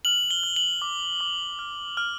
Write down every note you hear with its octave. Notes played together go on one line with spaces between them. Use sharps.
F6 F#7
G7
F6
F#7
D6
D6
F6
F6